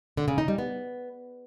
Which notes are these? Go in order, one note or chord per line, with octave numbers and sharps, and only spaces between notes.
D3
C#3
D#4
G3
B3